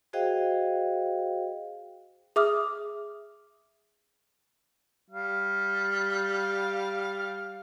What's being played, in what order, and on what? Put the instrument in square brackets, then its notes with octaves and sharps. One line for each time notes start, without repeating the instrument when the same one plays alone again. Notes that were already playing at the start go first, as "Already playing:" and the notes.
[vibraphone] F#4 G#4 C5 D#5 F5 G5
[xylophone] G#4 E5 D6 D#6 F6
[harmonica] G3 F5